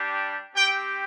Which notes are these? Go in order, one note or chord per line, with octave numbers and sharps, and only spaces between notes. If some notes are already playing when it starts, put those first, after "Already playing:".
Already playing: G3 D4 G4
C4 G4 G5